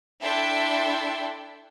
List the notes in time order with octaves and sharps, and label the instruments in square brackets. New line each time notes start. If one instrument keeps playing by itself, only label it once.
[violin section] D4 E4 A4 E5 G5 C6